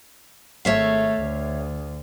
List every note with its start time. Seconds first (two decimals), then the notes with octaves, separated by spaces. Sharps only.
0.65 G#1 A3 C#5 E5 F5
1.18 D2